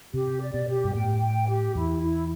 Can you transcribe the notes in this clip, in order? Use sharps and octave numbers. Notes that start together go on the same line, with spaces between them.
C3 G4
D5
B2
G4
G2
A2 G5
G5
G4
E2 E4
E4